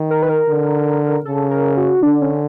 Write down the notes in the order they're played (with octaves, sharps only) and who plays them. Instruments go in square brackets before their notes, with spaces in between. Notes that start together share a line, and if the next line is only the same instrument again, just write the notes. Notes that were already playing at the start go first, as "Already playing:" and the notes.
Already playing: [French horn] D#3
[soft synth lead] A#4
B4
A#4
[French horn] D3
[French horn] C#3 [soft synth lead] A4
[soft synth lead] A#4
F#4
[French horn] D3 [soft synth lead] D4
[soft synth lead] C#4